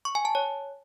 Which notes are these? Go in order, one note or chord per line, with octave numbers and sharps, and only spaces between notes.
C#6
G#5
A5
C#5